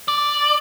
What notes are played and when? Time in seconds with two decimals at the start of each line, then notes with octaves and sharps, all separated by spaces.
0.08 D5